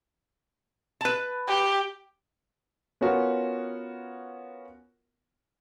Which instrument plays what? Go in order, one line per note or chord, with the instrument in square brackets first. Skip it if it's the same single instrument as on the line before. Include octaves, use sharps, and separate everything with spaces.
[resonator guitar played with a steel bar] B4 A5
[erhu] G4
[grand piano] B3 C#4 F4 F#4 A#4